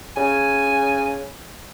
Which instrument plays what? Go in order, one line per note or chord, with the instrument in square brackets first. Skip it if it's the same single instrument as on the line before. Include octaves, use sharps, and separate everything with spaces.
[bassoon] C#3 [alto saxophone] G#5